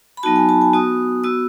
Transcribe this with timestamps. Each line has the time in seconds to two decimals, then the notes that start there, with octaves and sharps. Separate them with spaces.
0.17 B5
0.23 F#3 B3 D#4 F#4 A5
0.36 G#5
0.49 A5
0.61 G#5
0.73 B3 F#4 D#6
1.24 B3 F#4 E6